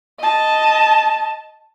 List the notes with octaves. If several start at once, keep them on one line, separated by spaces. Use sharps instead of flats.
D#5 A5